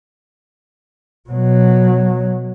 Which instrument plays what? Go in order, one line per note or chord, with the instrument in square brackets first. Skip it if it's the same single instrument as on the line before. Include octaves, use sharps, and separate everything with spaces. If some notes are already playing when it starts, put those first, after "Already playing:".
[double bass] B2 F#3